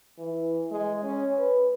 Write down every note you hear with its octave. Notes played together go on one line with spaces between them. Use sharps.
E3
G#3
C#4
B4